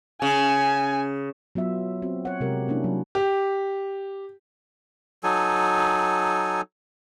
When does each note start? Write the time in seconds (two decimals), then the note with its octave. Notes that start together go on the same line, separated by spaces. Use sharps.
0.22 C#3 G#5
1.55 F#3 B3 F4 E5
2.02 C4 F#4
2.25 C#5 F#5
2.41 C3 G3 G#3 F#4 G4 A#4
2.68 A#3 C#4 D4 E4
2.84 F#3
3.15 G4
5.24 F#3 D#4 A4 G#5